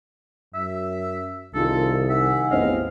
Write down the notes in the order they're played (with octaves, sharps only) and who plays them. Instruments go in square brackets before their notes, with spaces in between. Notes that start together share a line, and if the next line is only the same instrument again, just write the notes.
[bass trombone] F#2 [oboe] E5
[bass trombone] C2 [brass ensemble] D#3 F4 [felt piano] D#4 G#4 [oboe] A4
[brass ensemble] D#3 F#5 G#5 [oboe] E5
[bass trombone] A1 [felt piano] E2 C4 D#5 [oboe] F5